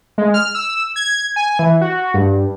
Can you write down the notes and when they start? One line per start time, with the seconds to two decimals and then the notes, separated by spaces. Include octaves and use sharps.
0.18 G#3
0.34 F6
0.55 E6
0.96 G#6
1.36 G#5
1.59 E3
1.81 F#4
2.14 G2